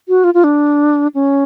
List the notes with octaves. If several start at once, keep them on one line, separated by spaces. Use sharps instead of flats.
F#4
F4
F4
D4
C#4